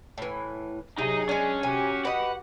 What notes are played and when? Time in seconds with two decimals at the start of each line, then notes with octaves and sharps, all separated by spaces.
0.18 A2 E3
0.98 C3 F#3 D#4 G#4 D#5
1.29 G#3 C#4 D4
1.63 C3 F#4 G4 G#5
2.05 B4 D#5 F#5